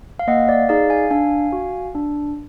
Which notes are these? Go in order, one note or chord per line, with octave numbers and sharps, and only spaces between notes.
F5
A#3 D#5 F#5
D5 F5
D#4 G#4 D5 F5
F5 G#5
D4 F5 G#5
F#4
D4